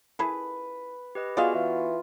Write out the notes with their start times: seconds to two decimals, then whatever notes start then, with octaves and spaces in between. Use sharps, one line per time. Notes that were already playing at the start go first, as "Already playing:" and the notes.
0.19 E4 G#4 A4 B4
1.15 G4 B4 D#5
1.37 B3 F4 F#4 G#4 D5 D#5 F5 F#5
1.54 E3